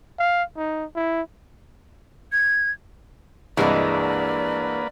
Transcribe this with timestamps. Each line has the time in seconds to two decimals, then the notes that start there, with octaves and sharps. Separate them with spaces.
0.19 F5
0.57 D#4
0.95 E4
2.32 G#6
3.57 C2 G2 E3 G#3 A#3 B4 D5